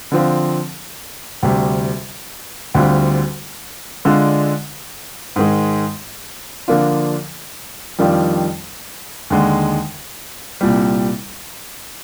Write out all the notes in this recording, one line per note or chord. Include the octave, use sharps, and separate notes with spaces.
D3 F3 C4 F4
D2 C3 G3
D2 D3 G3 C4 F4
D3 G#3 D4 F4
G#2 D#3 G#3
D3 F3 A#3 D4 F4
F2 D#3 G3 D4 F4
D#2 D3 G#3
C2 A#2 G3